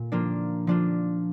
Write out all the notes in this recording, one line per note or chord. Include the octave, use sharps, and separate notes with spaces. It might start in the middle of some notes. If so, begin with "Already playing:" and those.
Already playing: A#2
F3 A#3 D4 F4
F3 D4 F4